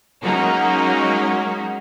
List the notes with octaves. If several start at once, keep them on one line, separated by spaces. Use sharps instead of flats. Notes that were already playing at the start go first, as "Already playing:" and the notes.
F#3 G#3 A#3 C#4 D#4 F#4